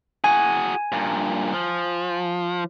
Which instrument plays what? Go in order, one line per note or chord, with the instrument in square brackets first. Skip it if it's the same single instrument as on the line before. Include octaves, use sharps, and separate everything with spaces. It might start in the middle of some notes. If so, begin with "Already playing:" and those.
[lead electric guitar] F#4 G#4 [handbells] G#5
[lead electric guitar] G2 A#2
F3